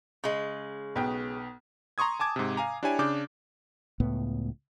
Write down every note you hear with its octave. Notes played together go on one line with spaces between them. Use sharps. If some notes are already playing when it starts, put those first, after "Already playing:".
C#3 G#3
B1 B3 G5
A#5 C6 C#6 D#6 G#6
G#5 A5 D6 G#6
G#2 C3
F5 G#5 A#5
D4 E4 G4 C#5 G#5
C#3 D4 D6 G6
C#2 A2 B3